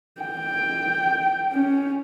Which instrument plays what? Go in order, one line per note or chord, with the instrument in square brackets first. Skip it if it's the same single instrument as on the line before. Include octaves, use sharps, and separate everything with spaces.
[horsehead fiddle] G5
C#4